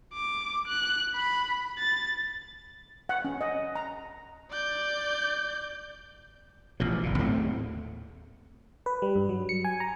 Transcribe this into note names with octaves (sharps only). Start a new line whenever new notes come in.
D6
F#6
B5
A6
F#5
C#4
D#5
A#5
D5 G6
A1 B2 F3
F#1 A#2
D#2 A2 A3 C4
B4
G3
G2
F#3
C#7
G#5
A#5